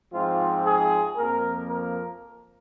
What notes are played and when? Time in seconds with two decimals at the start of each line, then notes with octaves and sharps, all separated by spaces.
0.12 G#2 F3 C4 F4
0.64 G#4
1.16 F2 F3 A#3 A#4
1.67 A#4